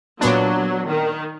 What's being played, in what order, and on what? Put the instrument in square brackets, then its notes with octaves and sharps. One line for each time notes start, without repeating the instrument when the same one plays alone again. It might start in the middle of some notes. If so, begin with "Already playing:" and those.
[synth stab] A#2 B3 D4 [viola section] F#3
[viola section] D#3